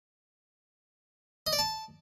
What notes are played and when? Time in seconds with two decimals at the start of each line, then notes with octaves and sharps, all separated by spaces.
1.47 D#5
1.53 D5
1.59 A5